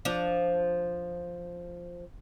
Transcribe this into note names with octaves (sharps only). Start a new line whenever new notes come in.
F3 D4